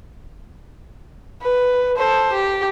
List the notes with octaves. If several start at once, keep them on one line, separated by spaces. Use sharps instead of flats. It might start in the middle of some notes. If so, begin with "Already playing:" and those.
B4
A4 C5
G4